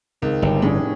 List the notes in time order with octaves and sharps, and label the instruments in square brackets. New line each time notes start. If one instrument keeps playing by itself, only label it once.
[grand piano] C#2 [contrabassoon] D#3 [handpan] C4
[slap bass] G1 [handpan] G4
[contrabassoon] F1 [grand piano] A2 [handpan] C#4 D4 G#4